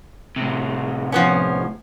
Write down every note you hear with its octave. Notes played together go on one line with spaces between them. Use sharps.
A2 C3
F3 B3 C#4